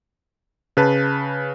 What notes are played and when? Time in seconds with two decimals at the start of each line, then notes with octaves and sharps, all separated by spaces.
0.77 C#3 B4 A5